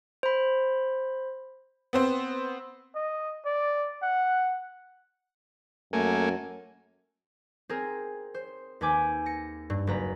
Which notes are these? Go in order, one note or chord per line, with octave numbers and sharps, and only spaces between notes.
C5 B5
B3 C4 C5
D#5
D5
F#5
F#2 A3 A#3 G#5
C4 G#4 A#4
C5
D#2 B4 G#5 D6 G6
A#6 C#7
G2
F#1 B4 A#5